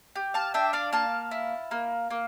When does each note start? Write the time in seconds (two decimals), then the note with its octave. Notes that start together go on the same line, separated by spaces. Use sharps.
0.15 G4
0.34 F5 A5
0.54 D4 E5 G5
0.73 D5 F5
0.93 A#3 F5 A5
1.31 E4
1.71 A#3
2.10 A#3